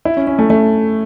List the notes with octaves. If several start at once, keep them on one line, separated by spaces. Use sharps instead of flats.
E4
C#4
C#4
A3
A3